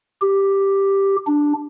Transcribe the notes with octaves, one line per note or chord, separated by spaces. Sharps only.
G4
D4